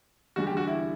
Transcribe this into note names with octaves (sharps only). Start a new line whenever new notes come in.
E2 D3 G3 F#4
G4
F#4
E4